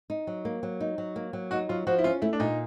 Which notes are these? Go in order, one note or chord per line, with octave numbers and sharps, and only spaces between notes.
D#4
F#3
A#3
F#3
D#4
F#3
A#3
F#3
D#4 F#4
F#3 F4
F3 F#4
E4
C#4 F4
A3 E4
D4
A#2 D#4